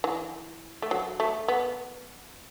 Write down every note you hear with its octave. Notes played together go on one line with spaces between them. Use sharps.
E3
A3
F#3
A3
B3